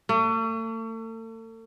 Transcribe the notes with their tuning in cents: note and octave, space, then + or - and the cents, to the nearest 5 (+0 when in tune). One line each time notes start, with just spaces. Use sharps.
A3 +40